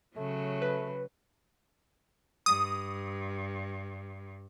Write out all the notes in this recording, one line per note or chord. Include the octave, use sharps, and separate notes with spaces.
C#3 F#3 A3
B4
G2 D#6